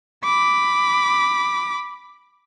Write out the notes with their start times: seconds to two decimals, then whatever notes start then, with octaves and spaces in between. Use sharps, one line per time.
0.24 B5 D6